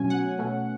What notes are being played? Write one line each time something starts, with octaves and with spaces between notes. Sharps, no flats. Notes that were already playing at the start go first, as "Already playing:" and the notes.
Already playing: B2 F#3 A3 C#4 G#5
F#5
B2 A3 C#4